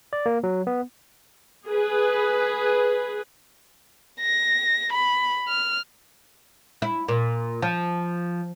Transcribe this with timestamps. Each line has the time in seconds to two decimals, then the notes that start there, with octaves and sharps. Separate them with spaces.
0.13 D5
0.26 A#3
0.43 F#3
0.67 B3
1.67 G#4 B4
4.21 A#6
4.92 B5
5.48 F6
6.82 E4
7.08 A#2
7.62 F3